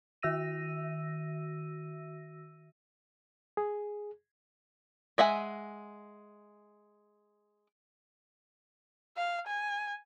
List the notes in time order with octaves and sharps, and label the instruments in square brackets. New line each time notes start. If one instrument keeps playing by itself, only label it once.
[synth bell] D#3 F#4 E5 E6 A#6 D#7
[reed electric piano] G#4
[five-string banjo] G#3 E5 F#5 G#5
[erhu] F5
G#5